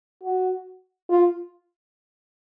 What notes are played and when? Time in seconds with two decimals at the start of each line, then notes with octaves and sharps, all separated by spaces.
0.23 F#4
1.10 F4